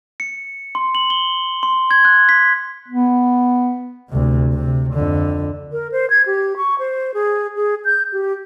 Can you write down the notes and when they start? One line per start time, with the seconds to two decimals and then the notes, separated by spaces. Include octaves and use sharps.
0.20 C#7
0.75 C6
0.95 F#7
1.10 G7
1.63 C6
1.91 G#6
2.05 F#6
2.29 B6
2.89 B3
4.09 D2 C3
4.53 C3
4.94 F2 D3
5.72 A#4
5.92 C5
6.10 G#6
6.26 G4
6.57 C#6
6.79 C5
7.14 G#4
7.56 G#4
7.85 G6
8.12 G4